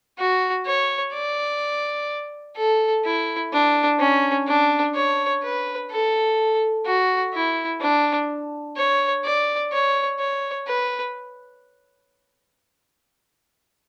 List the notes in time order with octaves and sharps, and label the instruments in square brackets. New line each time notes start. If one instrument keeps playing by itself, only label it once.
[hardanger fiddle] F#4
C#5
D5
A4
E4
D4
C#4
D4
C#5
B4
A4
F#4
E4
D4
C#5
D5
C#5
C#5
B4